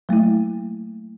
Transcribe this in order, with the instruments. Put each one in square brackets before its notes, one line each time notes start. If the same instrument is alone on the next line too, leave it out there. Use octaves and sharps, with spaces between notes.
[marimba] F#3 A3 A#3 E4